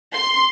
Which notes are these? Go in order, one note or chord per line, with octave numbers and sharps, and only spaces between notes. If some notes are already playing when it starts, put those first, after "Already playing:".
C6